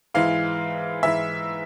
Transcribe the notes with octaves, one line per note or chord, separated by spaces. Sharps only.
G#2 E3 G#3 E4 F5
G#2 E3 G#3 E4 E5